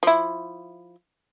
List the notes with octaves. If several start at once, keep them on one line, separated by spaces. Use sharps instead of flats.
F3 E4